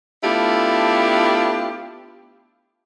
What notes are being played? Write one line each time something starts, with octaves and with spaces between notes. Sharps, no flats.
A3 B3 D4 E4 F4 G4